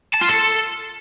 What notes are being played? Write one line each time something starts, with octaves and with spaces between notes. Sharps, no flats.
A5
F4
A4